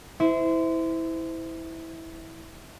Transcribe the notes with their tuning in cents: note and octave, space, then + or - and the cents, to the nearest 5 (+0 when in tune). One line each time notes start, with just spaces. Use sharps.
E4 -15 C5 -30